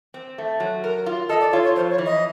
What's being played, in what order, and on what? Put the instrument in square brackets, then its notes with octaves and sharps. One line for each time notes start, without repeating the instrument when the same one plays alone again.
[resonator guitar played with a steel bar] C4
A3
F#3
A#4
F4
[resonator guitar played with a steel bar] A4 [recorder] D#5
[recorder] D5
[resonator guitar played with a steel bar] F4 [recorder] C#5
[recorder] C#5
[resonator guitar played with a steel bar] F2 [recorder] C5
[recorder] C#5
[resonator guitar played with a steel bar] E3
[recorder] D#5